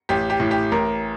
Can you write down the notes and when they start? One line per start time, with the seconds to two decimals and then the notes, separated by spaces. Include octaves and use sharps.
0.09 A1 G4
0.30 G4
0.40 A2
0.51 G4
0.72 A1 A#4